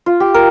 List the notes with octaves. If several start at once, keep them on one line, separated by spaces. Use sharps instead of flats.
F4
G4
A#4